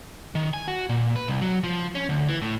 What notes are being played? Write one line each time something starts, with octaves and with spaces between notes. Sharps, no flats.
D#3
G#5
F#4
A#2
B4
C2
F#3
F3
C#4
D2
E3
A2